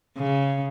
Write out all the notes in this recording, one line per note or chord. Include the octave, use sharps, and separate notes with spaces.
C#3